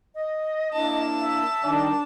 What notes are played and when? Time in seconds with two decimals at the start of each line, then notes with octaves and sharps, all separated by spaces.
0.15 D#5
0.73 A#3 D4 E4 A5
1.21 E5
1.63 D#3 G3 D4 D#4